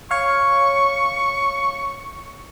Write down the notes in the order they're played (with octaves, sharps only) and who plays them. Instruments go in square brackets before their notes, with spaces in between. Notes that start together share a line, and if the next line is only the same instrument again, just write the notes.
[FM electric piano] C#5 F5 [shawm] C#6